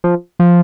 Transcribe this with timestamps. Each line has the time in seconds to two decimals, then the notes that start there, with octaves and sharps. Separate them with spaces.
0.04 F3
0.39 F3